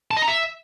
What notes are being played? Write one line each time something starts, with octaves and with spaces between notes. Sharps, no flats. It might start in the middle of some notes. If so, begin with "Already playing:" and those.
A5
D#5
A#5
E5